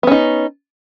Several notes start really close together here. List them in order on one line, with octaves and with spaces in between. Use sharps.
B3 C#4 D#4